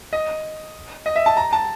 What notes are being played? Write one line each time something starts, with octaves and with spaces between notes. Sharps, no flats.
D#5
D#5
E5
A5
A#5
A5